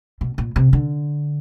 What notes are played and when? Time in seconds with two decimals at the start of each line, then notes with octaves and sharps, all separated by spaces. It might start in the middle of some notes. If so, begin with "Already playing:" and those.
0.21 B2
0.38 A#2
0.56 C3
0.73 D3